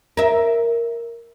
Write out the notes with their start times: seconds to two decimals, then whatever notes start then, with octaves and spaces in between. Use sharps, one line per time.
0.17 A#4 E5